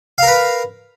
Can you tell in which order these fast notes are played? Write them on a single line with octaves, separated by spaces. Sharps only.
F5 A#4 B4